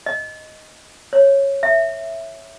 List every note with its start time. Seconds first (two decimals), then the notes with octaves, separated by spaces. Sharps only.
0.06 D#5
1.13 C#5
1.63 E5